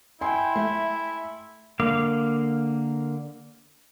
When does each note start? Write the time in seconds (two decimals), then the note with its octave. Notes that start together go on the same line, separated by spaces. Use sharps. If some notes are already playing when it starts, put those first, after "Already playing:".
0.21 E4 G5 G#5 C6
0.56 A3 E5
1.80 D3 A#3 F5 D6